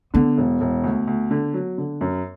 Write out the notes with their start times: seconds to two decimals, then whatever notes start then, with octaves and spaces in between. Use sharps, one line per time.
0.14 D3 B3
0.38 E1
0.61 E1
0.84 D2
1.07 D2
1.31 D3
1.54 F#3
1.78 D3
2.01 F#2